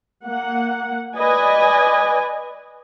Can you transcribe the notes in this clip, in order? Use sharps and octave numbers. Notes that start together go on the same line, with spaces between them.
A#3 F#5
B4 D5 D#5 G#5